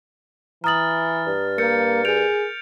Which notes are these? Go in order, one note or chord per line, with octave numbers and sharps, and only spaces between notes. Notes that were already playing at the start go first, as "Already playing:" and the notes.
E3 A#5 D#6 F6 A6 F#7
G2
A#3 A#4 G6 A6 C#7
G#4 G6 D7 F7